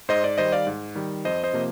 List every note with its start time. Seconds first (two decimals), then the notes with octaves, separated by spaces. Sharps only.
0.09 G#2 C5 D#5
0.24 D5
0.38 D#3 G3 C5 D#5
0.52 D5 F5
0.67 G#2
0.95 D#3 G3
1.25 F2 C5 D#5
1.44 C5 D#5
1.53 C3 F3 A#3